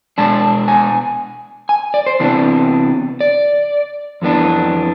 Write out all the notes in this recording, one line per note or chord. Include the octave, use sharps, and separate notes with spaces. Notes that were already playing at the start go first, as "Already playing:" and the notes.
B2 G#3 D4 A5
G#5
G#5
D5
C5
C3 E3 B3 D4
D5
F2 E3 B3 D4